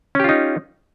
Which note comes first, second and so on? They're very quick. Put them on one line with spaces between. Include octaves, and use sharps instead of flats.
C#4 G4 F4 D#4